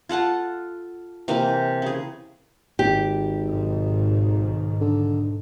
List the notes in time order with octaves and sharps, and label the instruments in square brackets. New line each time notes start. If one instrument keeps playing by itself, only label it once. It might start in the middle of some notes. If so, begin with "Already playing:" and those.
[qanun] F4 A4 F#5 A5
C3 E3 A#3
C#3 G#4
[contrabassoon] G#1 [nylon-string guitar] G4
[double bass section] B1 G#2 D#3
[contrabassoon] D3